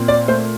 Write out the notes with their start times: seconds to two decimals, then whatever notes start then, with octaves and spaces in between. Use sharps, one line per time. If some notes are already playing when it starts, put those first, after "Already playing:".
Already playing: A#2 C4
0.08 D5
0.28 A3 C5